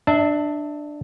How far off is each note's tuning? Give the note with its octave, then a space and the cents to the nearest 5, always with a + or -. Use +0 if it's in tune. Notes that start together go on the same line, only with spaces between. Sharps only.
D4 +15 E5 -20